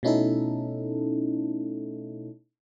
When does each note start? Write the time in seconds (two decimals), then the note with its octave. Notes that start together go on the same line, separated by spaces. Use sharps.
0.03 B2 A3 C#4 D#4 E4 A4